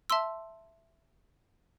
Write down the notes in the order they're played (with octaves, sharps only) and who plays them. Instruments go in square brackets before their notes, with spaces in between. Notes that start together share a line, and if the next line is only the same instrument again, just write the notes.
[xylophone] E5 A5 C6 E6